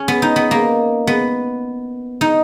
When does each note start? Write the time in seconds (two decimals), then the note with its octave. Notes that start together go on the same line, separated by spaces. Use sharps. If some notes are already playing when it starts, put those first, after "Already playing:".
Already playing: C#4
0.08 B3
0.22 D#4
0.36 B3
0.51 A#3
1.07 B3
2.21 D#4